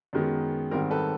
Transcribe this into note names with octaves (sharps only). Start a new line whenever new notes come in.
F#2 D#3 G#3 B3
G#2 D#3 G3 C4 A#4
A4 B4